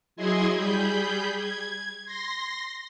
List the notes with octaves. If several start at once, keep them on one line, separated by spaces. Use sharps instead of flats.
F#3 E4 G#4 D#5 C6 G#6
G3 G#4 B5 G6
G#6
C6 A#6